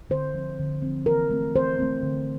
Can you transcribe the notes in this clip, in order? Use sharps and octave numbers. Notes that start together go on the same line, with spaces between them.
D3 C5
F3 C4
D3
F3 C4
E3 A#4
A3 C4
E3 C5
A3 C4
D3